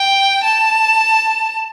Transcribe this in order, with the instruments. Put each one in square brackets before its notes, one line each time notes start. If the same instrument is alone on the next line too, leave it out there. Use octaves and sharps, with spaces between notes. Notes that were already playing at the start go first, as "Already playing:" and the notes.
Already playing: [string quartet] G5
A5